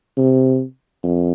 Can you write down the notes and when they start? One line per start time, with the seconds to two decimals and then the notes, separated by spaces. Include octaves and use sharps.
0.17 C3
1.03 F2